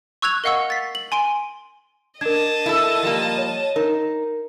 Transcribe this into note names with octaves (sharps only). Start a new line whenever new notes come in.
C#6 E6 F#6 G#6 F7
A#4 D#5 F5 F#5 C#6 E6
A6 B6 C7
F#7
G#5 C6 D7 G7
D4 A#4 D#5 A5 G#6
E4 A4
F3 G3 A#3
C#5
D#4 A#4